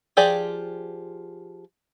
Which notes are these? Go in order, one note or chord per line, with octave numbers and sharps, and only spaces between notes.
F3 F4 G4 G#4 D5